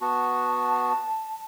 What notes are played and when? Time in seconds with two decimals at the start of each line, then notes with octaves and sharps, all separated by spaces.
0.01 B3 F#4 A5